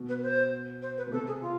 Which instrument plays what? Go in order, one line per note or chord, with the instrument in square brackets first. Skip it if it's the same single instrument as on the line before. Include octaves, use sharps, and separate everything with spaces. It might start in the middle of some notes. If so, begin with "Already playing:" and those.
Already playing: [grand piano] B2
[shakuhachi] B4
C5
C5
B4
[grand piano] B2
[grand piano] C3 [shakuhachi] A4
[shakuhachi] G#4
F4